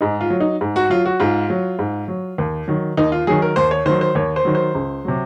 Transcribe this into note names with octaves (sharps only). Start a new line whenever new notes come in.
G#2 D#4
F4
F#3
D#4
G#2
F#4
F#3 F4
F#4
G#2 F4
F#3
G#2
F#3
D#2
D#3 F#3
D#2 D#4
F4
D#3 F#3 G#4
A#4
D#2 C5
C#5
D#3 F#3 C5
C5
D#2 C#5
C5
D#3 F#3
C5
C#2
C3 F#3